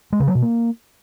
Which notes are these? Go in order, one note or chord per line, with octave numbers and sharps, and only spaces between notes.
G#3
C#3
F#3
B2
A#3